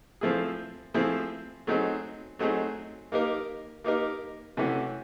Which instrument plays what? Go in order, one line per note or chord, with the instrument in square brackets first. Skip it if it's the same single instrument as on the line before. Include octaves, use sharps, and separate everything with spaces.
[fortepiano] F3 A3 C4 E4 G#4
F3 A3 C4 E4 G#4
F#3 A3 C4 D#4 G#4
F#3 A3 C4 D#4 G#4
A#3 D#4 G4 A#4
A#3 D#4 G4 A#4
C3 E3 A3 C#4 F#4